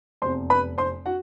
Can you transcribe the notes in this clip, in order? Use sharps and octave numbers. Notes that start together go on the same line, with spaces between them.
F1 E2 C3 C5 C6
B4 B5
C5 C6
F#4 F#5